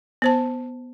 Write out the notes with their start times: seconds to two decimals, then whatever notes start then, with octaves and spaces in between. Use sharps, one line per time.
0.22 B3 C5 A5